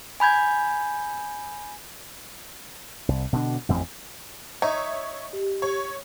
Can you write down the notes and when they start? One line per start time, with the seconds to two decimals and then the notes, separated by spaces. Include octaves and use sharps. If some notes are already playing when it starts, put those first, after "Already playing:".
0.20 G#5 B5 G6 G#6
3.08 C2
3.33 B2 D3 D4
3.69 A1 F2 C4
4.62 D#4 C#5 E5
5.33 G4
5.62 C#5